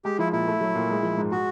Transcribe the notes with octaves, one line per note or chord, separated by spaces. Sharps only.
G#3 G4
F3 E4
A#2 E4
A3
F#3
A#2
G#3
F3
G#2
G#3 F#4